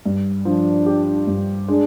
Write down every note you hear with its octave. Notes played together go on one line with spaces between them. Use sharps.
G2
F3 D4
G4
G2
G#3 D4